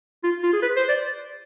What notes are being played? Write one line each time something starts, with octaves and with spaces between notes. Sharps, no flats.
F4
F4
G#4
B4
C5
D5